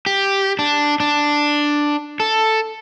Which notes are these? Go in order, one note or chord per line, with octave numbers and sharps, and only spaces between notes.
G4
D4
D4
A4